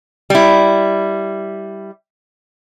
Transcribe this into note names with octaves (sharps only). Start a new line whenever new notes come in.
G3 E4